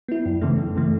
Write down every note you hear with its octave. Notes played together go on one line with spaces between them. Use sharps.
B3 E4
F#2
C#3 E3 A3
F#2
C#3 E3 A3